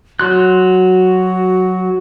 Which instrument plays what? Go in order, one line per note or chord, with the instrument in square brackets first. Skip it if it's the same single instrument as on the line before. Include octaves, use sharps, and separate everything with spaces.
[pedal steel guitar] F#3 C6 F#6 [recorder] F#4